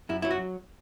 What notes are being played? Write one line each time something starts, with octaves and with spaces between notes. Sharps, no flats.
F#2 E4
F#3 E4
F#4